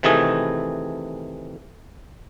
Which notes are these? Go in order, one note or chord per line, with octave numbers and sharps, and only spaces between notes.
C3 D#3 E3 A3 G#4 G#5